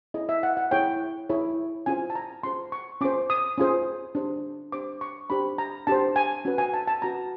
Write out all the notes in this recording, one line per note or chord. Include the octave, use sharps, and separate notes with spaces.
E4 G#4 C#5 D#5
E5
F#5
F#5
E4 G#4 C#5 G5
E4 G#4 C#5
C#4 F4 G#4 C5 G#5
A5
A#5
C#4 F4 G#4 C5 C6
C#6
C#4 F4 G#4 C5 D6
D#6
C#4 F4 G#4 C5
D4 G4 C5
D4 G4 C5 D6
C#6
D4 G4 C5 B5
A#5
D4 G4 C5 A5
G#5
C#4 F#4 B4
G#5
A5
A5
C#4 F#4 B4 A#5